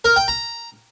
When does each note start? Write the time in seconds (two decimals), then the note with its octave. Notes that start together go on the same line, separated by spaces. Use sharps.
0.05 A#4
0.16 G5
0.28 A#5